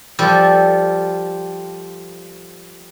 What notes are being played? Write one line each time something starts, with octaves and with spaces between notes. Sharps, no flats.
F3 G3 A4